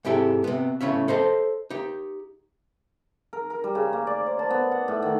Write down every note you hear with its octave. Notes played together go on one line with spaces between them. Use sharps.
G#2 C3 E4 G4 A4
C3 B3
A2 C#3 C#4 E5
A4 C5 D#5 A5
D#4 G4
A#4
A#4
G3
C#3
A#3
D5
C5
A5
B3
F#5
A2
D#3